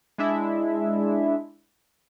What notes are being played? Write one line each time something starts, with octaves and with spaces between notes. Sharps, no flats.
G#3 D4 E4 E5